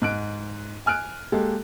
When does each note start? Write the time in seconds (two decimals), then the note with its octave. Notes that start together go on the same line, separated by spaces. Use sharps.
0.02 G#2 F#6 D7
0.86 G#5 F6 F#6 D7
1.32 G#3 A#3 G4 A4